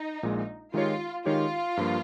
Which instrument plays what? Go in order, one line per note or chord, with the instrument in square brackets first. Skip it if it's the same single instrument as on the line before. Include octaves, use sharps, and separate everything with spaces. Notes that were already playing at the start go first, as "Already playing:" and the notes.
Already playing: [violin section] D#4
[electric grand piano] A#1 A#2 G#3
[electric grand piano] D#3 G#3 D#4 G4 C#5 [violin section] F4
[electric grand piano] D#3 G#3 D#4 G4 C#5 [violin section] F4
[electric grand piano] G2 F3 A#3